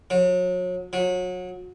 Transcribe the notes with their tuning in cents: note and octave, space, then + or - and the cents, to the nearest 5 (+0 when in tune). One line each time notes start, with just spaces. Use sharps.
F#3 -35
F#3 -30